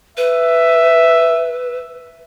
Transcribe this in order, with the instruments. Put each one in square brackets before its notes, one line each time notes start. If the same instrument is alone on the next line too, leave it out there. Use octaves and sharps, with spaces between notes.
[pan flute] B4 [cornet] E5